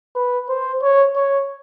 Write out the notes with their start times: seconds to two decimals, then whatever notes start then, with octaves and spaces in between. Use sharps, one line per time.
0.15 B4
0.49 C5
0.82 C#5
1.16 C#5